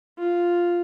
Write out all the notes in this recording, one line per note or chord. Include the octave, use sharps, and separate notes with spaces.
F4